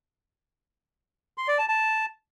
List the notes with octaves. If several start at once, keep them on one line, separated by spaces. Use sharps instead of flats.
C6
D5
A5
A5